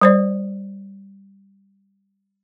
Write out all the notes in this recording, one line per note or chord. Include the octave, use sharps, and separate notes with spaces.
G3 C5 D5